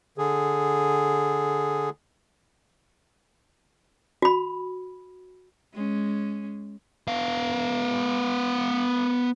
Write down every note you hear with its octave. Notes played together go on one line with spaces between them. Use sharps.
D3 G#4
F#4 B5
G#3 C#4
B3 F5